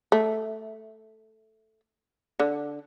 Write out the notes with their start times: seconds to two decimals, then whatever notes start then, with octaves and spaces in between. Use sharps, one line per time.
0.12 A3
2.40 D3